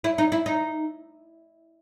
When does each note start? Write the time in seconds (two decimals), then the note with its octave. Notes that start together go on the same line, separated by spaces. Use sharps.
0.04 E4
0.18 D#4
0.32 E4
0.46 D#4